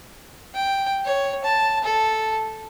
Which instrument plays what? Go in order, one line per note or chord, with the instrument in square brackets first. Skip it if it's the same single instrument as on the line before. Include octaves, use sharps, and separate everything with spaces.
[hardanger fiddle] G5
C#5
A5
A4